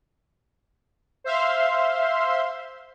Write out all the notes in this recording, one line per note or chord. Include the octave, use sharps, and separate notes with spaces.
C5 E5 F5 C6